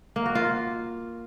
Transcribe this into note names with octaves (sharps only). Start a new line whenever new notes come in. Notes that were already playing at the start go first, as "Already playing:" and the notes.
A#3
F#4
F4